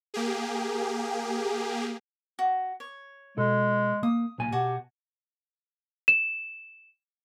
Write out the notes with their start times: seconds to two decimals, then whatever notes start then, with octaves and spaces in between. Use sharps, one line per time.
0.14 A#3 G4 G#4
2.39 F#4
2.80 C#5
3.38 B2 G#3 A4
4.03 A#3 D#6
4.38 B1 A#2 G#5
4.52 B2 F#4 G4 G#5 A5
6.08 E7